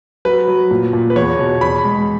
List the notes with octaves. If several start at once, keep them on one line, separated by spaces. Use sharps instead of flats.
F#3 B4
F#3
A#2
A#2
B4
E2 C#5
B2
E2 B5
G#3